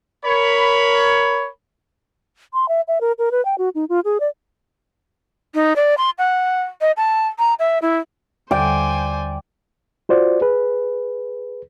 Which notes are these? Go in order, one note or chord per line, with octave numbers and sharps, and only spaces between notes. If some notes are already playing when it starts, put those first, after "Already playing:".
A#4 C#5 B5
C6
E5
E5
A#4
A#4
B4
G5
F#4
D#4
F4
G#4
D5
D#4
D5
C6
F#5
D#5
A5
A#5
E5
E4
D#2 D3 G3 C5 D5 G5 G#5 D6
F4 F#4 C5 D5
G#4 B4